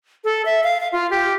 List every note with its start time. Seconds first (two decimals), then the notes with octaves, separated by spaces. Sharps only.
0.24 A4
0.45 E5
0.64 F5
0.80 F5
0.92 F4
1.11 G4